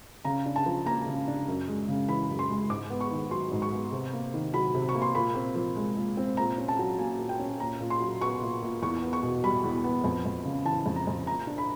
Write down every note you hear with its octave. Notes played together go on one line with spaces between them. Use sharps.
C#3 A#5
D4
A5
F3
A#3 A#5
C#3
D4
F#2
G#3
C#3
E3 B5
F#2
C6
G#3
G#2 D6
B3
C#6
D#3
F#3 C6
G#2
C#6
B3
C3
A#3
D#3
F#3 B5
C3
C#6
A#3
C6
A#2 B5
C4
F3
G#3
A#2
C4
A#2 A#5
C#4
A5
F#3
A#3 G#5
A#2
G5
C#4
A#2 A#5
A#2
C6
F#3
B3 C#6
A#2
A#2
E2 C#6
B3
C#6
B2
G3 B5
E2
B3
F2
F2
C#3
E3 A5
F2
A#5
F2
A#2 A#5
D4
B5